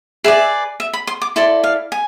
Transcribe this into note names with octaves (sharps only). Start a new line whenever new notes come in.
G#4 B4 D5 E5
E5
B5
C6
D6
E4 A4 D5 C6
F5
G#5